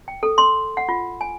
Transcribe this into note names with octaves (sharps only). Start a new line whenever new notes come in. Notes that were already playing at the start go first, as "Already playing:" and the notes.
G5
A4
C6
F#5
F4
G#5